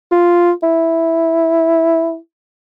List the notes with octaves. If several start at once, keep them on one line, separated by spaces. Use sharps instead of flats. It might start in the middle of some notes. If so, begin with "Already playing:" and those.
F4
E4